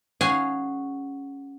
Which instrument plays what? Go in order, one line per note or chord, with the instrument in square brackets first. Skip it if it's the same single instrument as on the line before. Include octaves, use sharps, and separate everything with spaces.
[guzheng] C#4 F#4 G#4 F5 G#5